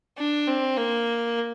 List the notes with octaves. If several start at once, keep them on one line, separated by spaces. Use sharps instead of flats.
D4
C4
A#3